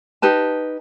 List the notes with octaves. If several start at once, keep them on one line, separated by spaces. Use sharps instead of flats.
D#4 G4 B4 A5